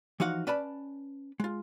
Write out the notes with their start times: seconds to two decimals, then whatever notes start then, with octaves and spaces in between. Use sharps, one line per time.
0.20 E3 F3 D#4 F#4 F5 F#5
0.47 C#4 B4 D5 A5 B5
1.40 G#3 F4